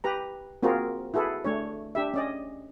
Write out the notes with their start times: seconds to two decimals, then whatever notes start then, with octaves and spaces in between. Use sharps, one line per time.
0.04 G4 B4 A#5
0.63 A#3 C4 F4 F#4 G#4 A#4
1.14 E4 F#4 G#4 A4 B4
1.44 A3 D4 C#5
1.95 D4 G4 E5
2.14 C#4 D5 D#5